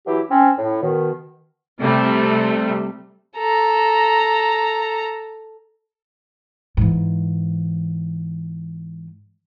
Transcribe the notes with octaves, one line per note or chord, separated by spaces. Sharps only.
E3 F#3 E4 G4
C4 C#4
A2
B2 D#3
C3 G3 A3
A4 A#5
G#2 E3